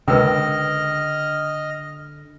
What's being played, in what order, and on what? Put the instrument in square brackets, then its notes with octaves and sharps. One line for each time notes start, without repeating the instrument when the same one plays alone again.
[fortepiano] C#2 E6 [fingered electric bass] D3 [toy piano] A#4 B4 G5 [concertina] D#5 F6